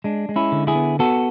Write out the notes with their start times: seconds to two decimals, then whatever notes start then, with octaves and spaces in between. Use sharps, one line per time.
0.04 G#3 D4
0.29 G#3
0.36 C#4 E4
0.52 D3
0.67 E4 G#4
0.75 B3
0.99 B3 F#4 A4